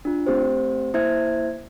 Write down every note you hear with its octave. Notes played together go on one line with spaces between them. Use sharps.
D4 F4
A3 C4 G4 C5
A#3 E4 C5 E5 G#6